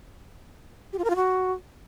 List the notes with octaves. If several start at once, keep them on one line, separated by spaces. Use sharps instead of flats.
G4
F4
A#4
F4
F#4